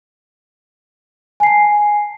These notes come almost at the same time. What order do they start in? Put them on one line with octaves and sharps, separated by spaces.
G#5 C7 A5